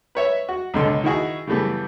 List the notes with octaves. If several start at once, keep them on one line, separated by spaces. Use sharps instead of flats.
B4 C#5 E5
F#4
C#2 B2 D3 A4 C6
D#3 E4 F#4 G#4
C#3 E3 G3 A3 B3